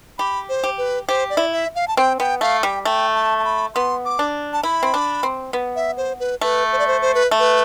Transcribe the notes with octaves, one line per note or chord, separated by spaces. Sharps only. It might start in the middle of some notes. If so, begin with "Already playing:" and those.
G4 B5
C5
G4
B4
G4 C5
D5
E4
E5
F5
A5
C4 G5
B3 G5
A3 F5
G3 G5
A3 G5
A5
A5
B5
B3 C6
D6
D4
A5
E4 B5
C4
D4
C4
B3
E5
C5
B4
A3 B4
C5
D5
C5
C5
B4
A3
B4